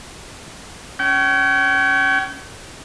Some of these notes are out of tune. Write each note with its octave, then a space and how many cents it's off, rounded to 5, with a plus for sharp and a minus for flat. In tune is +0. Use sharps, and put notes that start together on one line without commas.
C#4 +10 G5 -40